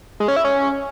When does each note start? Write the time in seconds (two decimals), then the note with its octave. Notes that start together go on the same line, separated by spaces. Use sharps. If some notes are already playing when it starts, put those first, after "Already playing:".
0.20 G#3
0.28 C#4
0.36 E4
0.44 C#4